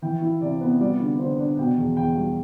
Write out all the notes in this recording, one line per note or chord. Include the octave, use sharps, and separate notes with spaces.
E3 G5
E4
C3 D5
B3
G3 D5
D3
D3 C5
D4
B2 G5
E2
E2 G5
G3